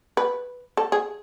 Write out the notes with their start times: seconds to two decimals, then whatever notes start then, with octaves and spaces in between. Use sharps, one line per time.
0.17 B4
0.77 A4
0.92 G#4